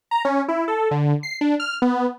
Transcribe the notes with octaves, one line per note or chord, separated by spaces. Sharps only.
A#5
C#4
E4
A4
D3
C7
D4
F6
B3